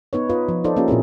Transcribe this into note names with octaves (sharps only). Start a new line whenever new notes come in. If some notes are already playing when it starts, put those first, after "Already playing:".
B3 D#4 B4 C#5
F4 B4 D#5
F3
D#4 F4 A4 C5 D5
A#3 C#4 F4 G4
A#2 C4 E4 G#4